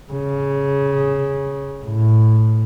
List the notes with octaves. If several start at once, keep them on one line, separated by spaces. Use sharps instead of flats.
C#3
A2